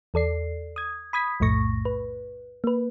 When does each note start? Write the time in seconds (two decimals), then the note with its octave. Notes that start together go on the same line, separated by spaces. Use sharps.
0.14 E2 A4 D5 C7
0.76 D#6 G#6
1.13 B5 D#6 G#6 B6
1.40 B1 F2 A2 A3 C#6 A#6
1.85 B4
2.64 A#3 B4